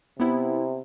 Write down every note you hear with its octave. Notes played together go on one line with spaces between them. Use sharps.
C3 B3 E4